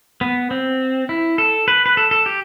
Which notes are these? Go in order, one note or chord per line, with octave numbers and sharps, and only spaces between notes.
B3
C4
E4
A4
B4
B4
A4
A4
G4